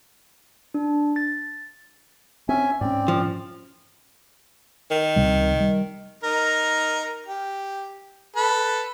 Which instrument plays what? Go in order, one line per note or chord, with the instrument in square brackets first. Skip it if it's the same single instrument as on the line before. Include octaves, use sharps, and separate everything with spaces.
[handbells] D4
A6
[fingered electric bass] C4 [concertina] C#4 E5 G#5
[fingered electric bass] G#2 C#4 [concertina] C4 D5
[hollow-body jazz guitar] F3
[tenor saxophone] D#3
[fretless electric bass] C#2 C3 G3
G3
[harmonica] D#4 A#4
G4
A4 B4 B5